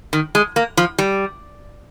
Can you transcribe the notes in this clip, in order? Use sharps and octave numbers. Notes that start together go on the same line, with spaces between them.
D#3
G#3
A#3
F3
G3